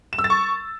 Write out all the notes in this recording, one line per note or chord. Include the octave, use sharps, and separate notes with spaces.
E7
E6
A6
C#6